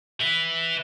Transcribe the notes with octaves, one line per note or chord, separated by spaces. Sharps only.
B4 E5